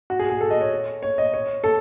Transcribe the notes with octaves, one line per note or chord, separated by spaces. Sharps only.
F#4
G#4
G#4
A4
D#5
C#5
C#5
D#5
C#5
A4